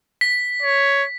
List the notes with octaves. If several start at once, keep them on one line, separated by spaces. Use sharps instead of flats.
B6
C#5